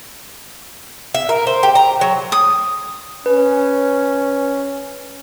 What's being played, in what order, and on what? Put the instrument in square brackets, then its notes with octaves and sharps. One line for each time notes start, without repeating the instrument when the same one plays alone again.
[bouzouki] E5
A#4
C5
G4
A#5
F#3
[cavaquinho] D#6
[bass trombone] C#4 [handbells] B4